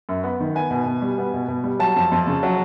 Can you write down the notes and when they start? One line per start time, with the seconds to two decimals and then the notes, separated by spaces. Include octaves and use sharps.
0.09 F#2
0.24 B3
0.40 D#3
0.55 B3 G#5
0.71 B2
0.86 B2
1.02 G3
1.18 B3
1.34 B2
1.48 B2
1.64 G3
1.79 F#3 A5
1.96 F2
2.12 F2
2.27 C#3
2.43 F#3